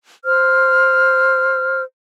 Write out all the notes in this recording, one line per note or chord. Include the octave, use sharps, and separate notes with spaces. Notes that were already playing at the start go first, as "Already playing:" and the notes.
C5 E6 F6